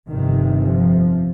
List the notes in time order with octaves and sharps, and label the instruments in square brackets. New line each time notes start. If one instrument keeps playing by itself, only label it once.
[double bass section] G1 F2 C3 D#3
F3